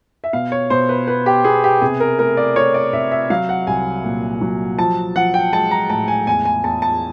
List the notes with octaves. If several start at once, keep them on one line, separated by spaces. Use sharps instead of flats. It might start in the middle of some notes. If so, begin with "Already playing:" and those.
E5
B2 F5
C#5
B2 C5
B4
B3 B4
G4
B3 G#4
G4
C3 G#4
A#4
A3 A#4
D5
A3 C#5
D5
C3 E5
E5
F#3 F5
F#5
C2 G#5
A#2
F#3
F3 A5
F3 F#5
G5
G#3 A5
A#5
A2 A5
G#5
E2 G#5
G#5
E2 A5
A5